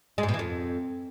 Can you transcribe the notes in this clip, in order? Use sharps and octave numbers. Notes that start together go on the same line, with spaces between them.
G#3
G#2
B2
E3
F2